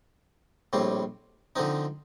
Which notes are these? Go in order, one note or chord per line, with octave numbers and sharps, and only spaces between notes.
A#1 A2 G3 C4
D3 F3 C4 D#4